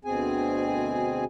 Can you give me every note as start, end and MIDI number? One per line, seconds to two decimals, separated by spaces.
0.05 1.24 38
0.05 1.24 47
0.05 1.24 60
0.05 1.24 68
0.05 1.24 80